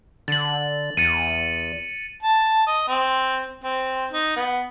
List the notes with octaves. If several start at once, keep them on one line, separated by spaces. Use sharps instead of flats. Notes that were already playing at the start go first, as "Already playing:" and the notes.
D3 A6 F#7
E2 A6 C#7 D#7
A5
D#5
C4
C4
D#4
B3